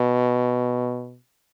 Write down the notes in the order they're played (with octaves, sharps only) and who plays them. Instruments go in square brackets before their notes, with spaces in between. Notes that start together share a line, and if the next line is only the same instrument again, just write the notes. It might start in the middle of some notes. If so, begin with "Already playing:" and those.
Already playing: [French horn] B2